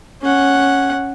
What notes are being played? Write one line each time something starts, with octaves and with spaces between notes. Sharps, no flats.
C#4 F#5